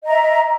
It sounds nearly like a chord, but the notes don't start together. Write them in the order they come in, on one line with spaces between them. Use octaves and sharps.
D#5 A#5 E5